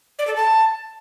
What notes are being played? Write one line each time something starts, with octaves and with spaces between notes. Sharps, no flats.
D5
A4
A5